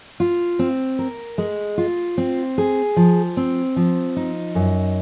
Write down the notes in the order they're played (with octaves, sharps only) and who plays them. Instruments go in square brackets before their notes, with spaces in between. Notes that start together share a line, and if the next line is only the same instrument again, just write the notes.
[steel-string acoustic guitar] F4
C4
A#4
G#3
F4
C4
G#4
F3
C4
F3
D#4
F#2